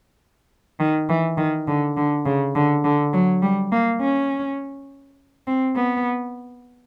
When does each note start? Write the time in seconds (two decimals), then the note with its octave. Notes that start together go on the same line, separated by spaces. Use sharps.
0.80 D#3
1.09 E3
1.38 D#3
1.68 D3
1.97 D3
2.26 C#3
2.55 D3
2.84 D3
3.13 F#3
3.43 G3
3.72 A#3
4.01 C#4
5.48 C4
5.76 B3